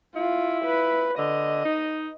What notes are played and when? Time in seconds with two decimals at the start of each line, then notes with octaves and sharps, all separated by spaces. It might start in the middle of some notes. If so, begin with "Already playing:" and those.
0.16 E4 F4
0.65 B4
1.18 D3 D#5
1.65 D#4